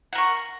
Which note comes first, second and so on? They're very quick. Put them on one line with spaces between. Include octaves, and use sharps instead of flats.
F#5 A#4 C#6